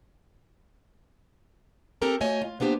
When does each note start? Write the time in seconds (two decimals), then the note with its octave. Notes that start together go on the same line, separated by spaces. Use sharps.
2.02 C4 G4 A4 A#4 A#5
2.21 A3 F#4 C#5 D#5 G#5
2.42 F4
2.60 A#3 B3 D4 G4 C5